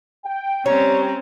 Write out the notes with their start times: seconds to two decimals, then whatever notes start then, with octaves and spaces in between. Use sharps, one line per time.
0.25 G5
0.66 G3 C4 C#4 C#5 A#5